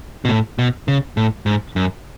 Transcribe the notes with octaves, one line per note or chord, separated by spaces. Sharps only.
B2
A2
B2
C#3
A2
G#2
F#2